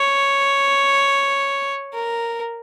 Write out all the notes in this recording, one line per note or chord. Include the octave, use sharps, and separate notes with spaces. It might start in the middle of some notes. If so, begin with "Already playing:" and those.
Already playing: C#5
A#4